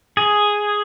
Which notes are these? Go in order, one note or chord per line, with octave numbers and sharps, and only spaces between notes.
G#4